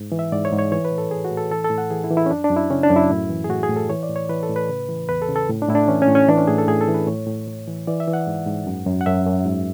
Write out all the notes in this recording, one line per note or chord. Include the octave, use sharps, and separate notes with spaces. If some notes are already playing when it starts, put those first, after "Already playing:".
Already playing: G#2
E3
E5
G#2 D5
C#5
G#2
C#5
E3 C#5
B4
A2
A4
E3 G#4
F#4
A2
A4
E3 A4
A4
A2
F#5
E3 G#4
E4
E3
E4
C#4
F#2 D4
D4
F#2
E4
C#3 C#4
D4
F#2
E4
A2
E3
G#4
A2 F#4
G#4
A2
A4
E3 C#5
D5
A2
C#5
E3 B4
A4
A2
B4
C#3
E3
E2 B4
A4
C#3
A4
A2
D4
A2 E4
D4
E3 C#4
C#4
A2
C#4
E3 D4
C#4
A2 G#4
A4
A2 G#4
A4
E3
B4
A2 C#5
A2
A2
E3
E3 D5
E5
E3
F#5
G#2
G#2
F#2
F#2
F#5
F#2 E5
F#2
G#2